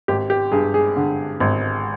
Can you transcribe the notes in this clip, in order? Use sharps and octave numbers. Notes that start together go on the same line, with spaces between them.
G#1 G4
G4
G2 G#4
G#4
D3
G#1